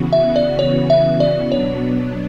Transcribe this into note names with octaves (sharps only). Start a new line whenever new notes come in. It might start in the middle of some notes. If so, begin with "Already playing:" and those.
Already playing: C#3 E3 B3 F#4
E5
D5
C#5
E5
D5
B2 F#3 B3 D4 C#5